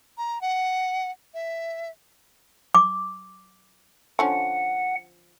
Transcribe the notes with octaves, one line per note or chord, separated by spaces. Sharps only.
A#5
F#5
E5
D6
D3 F3 C#4 F#5